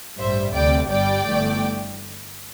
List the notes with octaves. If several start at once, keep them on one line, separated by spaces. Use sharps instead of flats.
A1 G2 G3 C5 E5
D2 C3 G3 D5 G5
G1 G2 G3 D5 G5
G1 G2 E3 A3